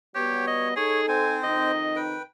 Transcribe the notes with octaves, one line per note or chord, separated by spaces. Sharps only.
F#3 G3 B3 G4 C#5
D#5
D#4 G#4 A4 C#5
C4 C5 G#5
F2 D#3 D#4 D#5
B4 G5